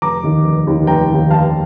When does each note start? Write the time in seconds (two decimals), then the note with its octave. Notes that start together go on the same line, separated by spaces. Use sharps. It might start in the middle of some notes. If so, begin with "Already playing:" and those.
0.02 F1 A#5 D6
0.23 D#2 D#3
0.45 F1
0.67 D#2 D#3
0.87 F1 G5 A#5
1.09 D#2 D#3
1.31 F1 F5 A5